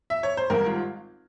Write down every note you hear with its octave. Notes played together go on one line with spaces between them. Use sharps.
E5
C#5
C5
G#1 G#2 G3 A#4
F4